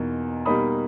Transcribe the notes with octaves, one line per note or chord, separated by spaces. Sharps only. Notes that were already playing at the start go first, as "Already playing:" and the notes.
Already playing: E2 B2 A#3 D#4
B2 G3 A#3 D#4 B5 D#6